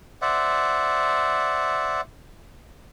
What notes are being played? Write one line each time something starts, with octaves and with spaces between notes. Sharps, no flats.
C5 D5 E5 F#5